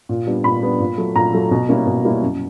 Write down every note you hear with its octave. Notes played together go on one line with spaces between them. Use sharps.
A#2
G3 B3 D4
A#2 B5
G3 B3 D4
A#2
F#3 A3
A#2 A#5
F#3 A3
B2
G3 A#3 C#4 E4
B2
G3 A#3 C#4 E4
F#2